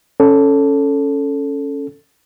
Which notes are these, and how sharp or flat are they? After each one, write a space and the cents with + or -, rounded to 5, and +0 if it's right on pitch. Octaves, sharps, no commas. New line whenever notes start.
C#4 +0 A4 +0